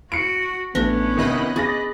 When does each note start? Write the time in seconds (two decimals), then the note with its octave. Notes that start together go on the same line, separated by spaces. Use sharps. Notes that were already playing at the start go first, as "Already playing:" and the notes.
0.12 F#4 C#7 D7
0.75 A1 A3 B3 C#4 D4
1.17 C2 D#3 D#5 B5 F#6
1.56 G#4 D6 A6 A#6